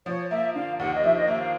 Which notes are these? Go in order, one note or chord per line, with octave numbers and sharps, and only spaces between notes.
F3 C#5
A#3 E5
D3 F5
D#2 F#5
D#5
F3 E5
D#5
A#3 E5
F5